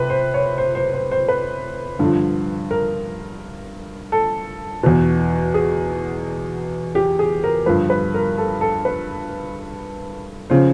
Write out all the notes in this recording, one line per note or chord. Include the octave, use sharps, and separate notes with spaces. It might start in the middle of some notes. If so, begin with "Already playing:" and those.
Already playing: C3 B4
C5
C#5
C5
C5
C5
C5
B4
G2 D3 F3
A#4
A4
E2 B2
G#4
G4
G#4
A#4
G2 D3 F3 B4
B4
A#4
A4
A4
B4
C#3 F3 C5